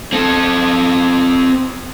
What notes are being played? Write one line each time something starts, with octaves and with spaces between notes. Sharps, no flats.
C4 A4